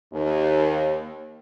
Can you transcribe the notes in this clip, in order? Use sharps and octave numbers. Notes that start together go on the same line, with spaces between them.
D#2